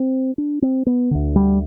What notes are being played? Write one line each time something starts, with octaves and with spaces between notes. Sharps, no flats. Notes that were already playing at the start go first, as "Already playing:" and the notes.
Already playing: C4
D4
C4
B3
D2 D3
G3